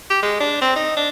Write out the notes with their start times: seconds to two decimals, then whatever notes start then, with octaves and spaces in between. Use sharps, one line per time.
0.10 G4
0.23 G#3
0.41 D4
0.62 C4
0.76 D#4
0.97 D4